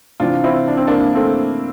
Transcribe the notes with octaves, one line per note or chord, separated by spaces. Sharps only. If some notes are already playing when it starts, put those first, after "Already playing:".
C3 E3 D4 F4
C4 E4
D4
C4
A#3 D4
A3 C4